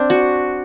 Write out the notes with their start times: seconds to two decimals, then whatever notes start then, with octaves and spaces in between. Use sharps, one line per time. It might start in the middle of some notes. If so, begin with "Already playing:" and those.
Already playing: C4 D4
0.10 F#4